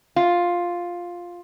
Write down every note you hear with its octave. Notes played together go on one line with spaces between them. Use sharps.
F4